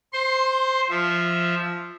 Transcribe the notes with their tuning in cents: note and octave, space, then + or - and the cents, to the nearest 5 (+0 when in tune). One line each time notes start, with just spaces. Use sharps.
C5 +0 C6 +25
F3 -5 E5 +0